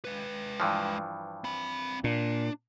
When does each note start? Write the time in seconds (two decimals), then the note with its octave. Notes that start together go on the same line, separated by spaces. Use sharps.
0.05 G#3 B4
0.60 G2 E3 F3
1.44 C4 B5
2.04 A#2 D4